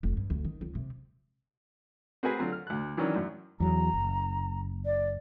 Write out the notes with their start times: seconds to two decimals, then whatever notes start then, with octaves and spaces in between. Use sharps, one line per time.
0.03 F1
0.17 G2
0.30 D2
0.45 D#3
0.61 C#2
0.75 C3
2.23 C4 F#4 G#4 A#4 B4 G#5
2.39 D3 F#3 C4 F4
2.52 F6
2.67 D2 F#6
2.97 D#3 E3 F#3 C#4 D4
3.16 F#2
3.60 E2 F#3 A#5
3.94 F#1
4.86 D5